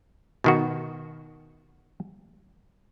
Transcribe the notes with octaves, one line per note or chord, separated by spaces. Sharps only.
B2 D#3 F#4